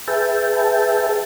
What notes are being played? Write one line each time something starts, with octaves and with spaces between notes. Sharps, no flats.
G#4 B4 E5 G5 A5